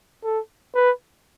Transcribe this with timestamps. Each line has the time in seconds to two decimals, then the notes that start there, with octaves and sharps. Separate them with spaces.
0.24 A4
0.75 B4